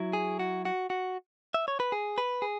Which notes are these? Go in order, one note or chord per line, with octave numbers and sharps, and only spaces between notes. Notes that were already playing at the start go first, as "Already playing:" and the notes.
Already playing: F#3 E4
G#4
F#4
F#4
F#4
E5
C#5
B4
G#4
B4
G#4